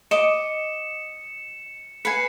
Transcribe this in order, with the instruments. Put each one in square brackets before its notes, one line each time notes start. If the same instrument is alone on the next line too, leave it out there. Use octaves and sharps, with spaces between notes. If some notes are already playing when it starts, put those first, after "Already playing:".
[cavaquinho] D#5 D6 [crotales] C#7 E7
[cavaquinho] B4 G#5 [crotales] C7 C#7